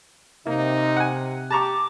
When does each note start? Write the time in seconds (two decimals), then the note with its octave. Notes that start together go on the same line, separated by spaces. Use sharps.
0.47 C3 A#3 D#4
0.97 F#5 G#5
1.51 G4 A5 A#5 C#6 D6